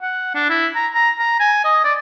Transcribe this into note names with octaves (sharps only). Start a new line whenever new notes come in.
F#5
D4
E4
A#5
A#5
A#5
G#5
D#5
D5